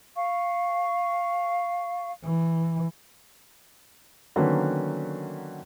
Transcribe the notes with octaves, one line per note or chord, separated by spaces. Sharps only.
F5 C#6
E3
D3 D#3 F#3 A#3 B3 C#4